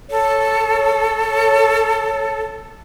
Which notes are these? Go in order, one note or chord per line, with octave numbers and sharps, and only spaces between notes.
A4 C#5